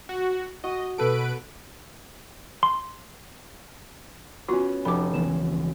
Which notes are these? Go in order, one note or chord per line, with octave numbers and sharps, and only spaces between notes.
F#4
F#4 D#5
B2 A4 B4 D7
C6
B3 C#4 F4 F#4
F1 B5 D6
C#2 E3 B3 E7